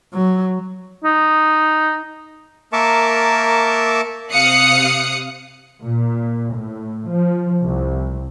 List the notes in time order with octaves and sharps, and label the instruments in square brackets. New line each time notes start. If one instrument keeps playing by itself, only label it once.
[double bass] F#3
[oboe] D#4
[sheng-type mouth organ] A#3 A#4 E5 A5 C#6 D6
[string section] C3 F5 D#6 F#6 C#7
[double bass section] A#2
A2
F3
C2